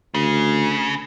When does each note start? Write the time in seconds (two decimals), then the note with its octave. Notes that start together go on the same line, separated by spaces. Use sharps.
0.14 D2 C#3